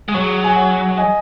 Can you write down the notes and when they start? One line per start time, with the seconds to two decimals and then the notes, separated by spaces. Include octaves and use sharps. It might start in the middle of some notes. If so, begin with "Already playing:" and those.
0.09 G#3
0.14 F#3 G#4 C#5
0.44 G#5
0.56 C#5 F#5
0.88 F#5
0.97 D#5 G#5